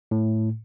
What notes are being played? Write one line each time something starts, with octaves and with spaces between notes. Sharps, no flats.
A2